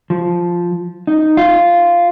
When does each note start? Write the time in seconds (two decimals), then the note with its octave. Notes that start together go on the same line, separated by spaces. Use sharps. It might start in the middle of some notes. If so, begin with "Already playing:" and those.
0.10 F3
1.07 D#4
1.37 F4